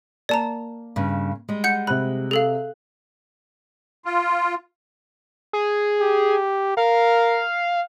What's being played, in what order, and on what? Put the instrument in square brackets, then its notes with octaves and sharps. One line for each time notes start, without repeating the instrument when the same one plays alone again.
[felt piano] A#3 [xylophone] D5 A5 A#5
[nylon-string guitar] G2 C#3
G3 G#3
[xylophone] F#5 G6 C#7
[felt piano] C3 F#6 [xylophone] B5
[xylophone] G#4 A4 F5
[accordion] F4
[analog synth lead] G#4
[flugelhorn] G4
[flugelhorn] A#4 [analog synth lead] F5